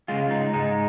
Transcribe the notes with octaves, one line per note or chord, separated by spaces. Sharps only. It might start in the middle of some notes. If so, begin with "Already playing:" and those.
C#3 G#3 F4
D#4
G#2 G#3 D#4